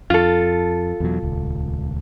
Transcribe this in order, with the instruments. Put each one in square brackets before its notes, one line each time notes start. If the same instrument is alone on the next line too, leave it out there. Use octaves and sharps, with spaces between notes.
[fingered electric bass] F2 [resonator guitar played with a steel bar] F4 A4
[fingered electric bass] E2 B2 F#3
D#1 C#2